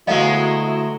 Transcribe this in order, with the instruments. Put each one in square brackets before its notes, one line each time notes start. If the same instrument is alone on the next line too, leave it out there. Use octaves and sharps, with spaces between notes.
[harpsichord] D2 A3 B3 [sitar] F#3 G#3 [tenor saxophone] E4 [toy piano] D#5 F5